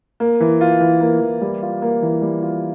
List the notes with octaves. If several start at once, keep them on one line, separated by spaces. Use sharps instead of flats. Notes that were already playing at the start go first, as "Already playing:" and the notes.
A#3
E3
F4
E3
A#3
E3
G3
F4
A#3
E3
G3
F4